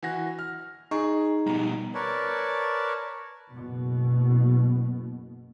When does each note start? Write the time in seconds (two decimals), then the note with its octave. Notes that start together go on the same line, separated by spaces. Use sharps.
0.03 E3 F#4 A#6
0.39 F6
0.91 D#4 G#4 C#6
1.47 B2 G3 A#5
1.94 A#4 B4 C#5 D5 A5
3.51 F#1 B2